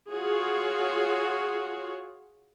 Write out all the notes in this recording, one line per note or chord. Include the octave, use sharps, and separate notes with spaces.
F4 F#4 G#4 C#5